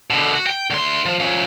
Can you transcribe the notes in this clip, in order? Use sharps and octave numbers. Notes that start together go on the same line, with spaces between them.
B2 D3
F#4
G5
D2 C6
F3
F3 C#4